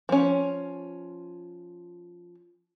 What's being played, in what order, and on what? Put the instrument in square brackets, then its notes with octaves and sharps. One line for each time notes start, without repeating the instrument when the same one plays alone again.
[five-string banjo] F3 C#4